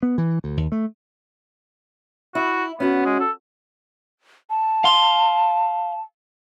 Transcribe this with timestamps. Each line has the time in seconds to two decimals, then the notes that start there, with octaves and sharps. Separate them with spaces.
0.03 B3
0.18 E3
0.44 D2
0.57 D#2
0.72 A3
2.35 E4 F#4
2.80 B3 C#4 F#4
3.05 G#3
3.20 A4
4.50 A5
4.84 F5 C6